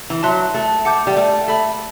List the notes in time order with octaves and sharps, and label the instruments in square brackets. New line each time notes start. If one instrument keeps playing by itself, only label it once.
[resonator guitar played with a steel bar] E3
[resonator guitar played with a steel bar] F#3 [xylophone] E5 A5 C6 F#6
[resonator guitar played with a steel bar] A3
[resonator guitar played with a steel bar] A3 [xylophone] F#5 A5 D6 G6
[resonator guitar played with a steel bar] G3
A3
[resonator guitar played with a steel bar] A3 [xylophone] A4 E5 B5